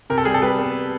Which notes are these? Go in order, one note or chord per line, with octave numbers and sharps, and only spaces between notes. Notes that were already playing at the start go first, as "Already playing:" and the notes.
C3 A#4
A4
G3 G#4
A4
G3 B4
B3